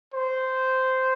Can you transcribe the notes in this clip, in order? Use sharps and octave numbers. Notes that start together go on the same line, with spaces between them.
C5